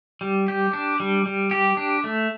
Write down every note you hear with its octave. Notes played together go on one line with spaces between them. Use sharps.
G3
G4
D4
G3
G3
G4
D4
A3